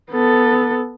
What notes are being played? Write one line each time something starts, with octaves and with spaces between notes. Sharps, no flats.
B3 A4